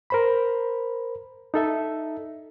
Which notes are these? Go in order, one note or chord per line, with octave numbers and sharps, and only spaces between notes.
A#4 C5 B5
D#4 A4 E5